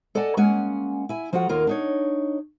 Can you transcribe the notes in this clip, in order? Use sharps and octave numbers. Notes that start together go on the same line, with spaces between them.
A4 D5 D#5 F#5 G#5 A5
G#3 A#3 C#4 F#5 G#5
E4 G#5
F3 F4 F#4 A4 F#5
D#2 A#3 F4 A#4
D4 D#4 C#5